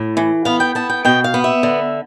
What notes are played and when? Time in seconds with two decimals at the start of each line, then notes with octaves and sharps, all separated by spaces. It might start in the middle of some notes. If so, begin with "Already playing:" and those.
Already playing: A2
0.17 E3
0.45 B3 F5
0.60 G5
0.75 B3 A5
0.90 G5
1.05 B2 G5
1.24 F5
1.34 B3
1.44 E5
1.63 D3